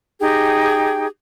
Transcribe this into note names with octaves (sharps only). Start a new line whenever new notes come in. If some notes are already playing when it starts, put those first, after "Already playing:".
D#4 G4 G#4 G5